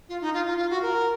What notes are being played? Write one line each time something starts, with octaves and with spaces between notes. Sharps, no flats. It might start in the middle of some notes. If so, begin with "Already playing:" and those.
F4
D#4
F4
F4
F4
F#4
A#4